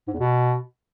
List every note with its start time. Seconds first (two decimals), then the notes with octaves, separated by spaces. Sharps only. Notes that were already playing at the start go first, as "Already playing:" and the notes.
0.08 G#2
0.14 E2
0.20 B2